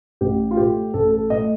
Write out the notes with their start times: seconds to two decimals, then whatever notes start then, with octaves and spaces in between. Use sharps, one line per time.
0.21 A1 G4
0.51 F4
0.57 A2 A3 G4
0.94 A1 A4
1.12 A4
1.30 A2 A3 D#5